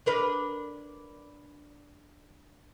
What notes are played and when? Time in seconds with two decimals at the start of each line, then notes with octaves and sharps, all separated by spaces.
0.06 D4 A#4 B4